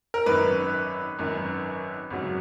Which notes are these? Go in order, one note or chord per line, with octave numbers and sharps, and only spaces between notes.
A#4
G#1 F#2 D#3 B4
G#1 F#2 D#3
G#1 F#2 C#3 F#3